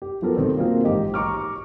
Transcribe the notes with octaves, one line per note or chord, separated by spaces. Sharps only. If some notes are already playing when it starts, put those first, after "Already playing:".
G4
F3 F#3 B3 A4 A#4
B2 D#3 C4 A4
F#3 A#3 C4 F4 G#4 A#4
A1 G#2 G4 D#5
A#5 C#6 D6 F6